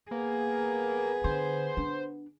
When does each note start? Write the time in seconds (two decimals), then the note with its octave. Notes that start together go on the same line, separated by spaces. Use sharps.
0.11 A#3 B3 G#4
1.24 D3 C5
1.77 D4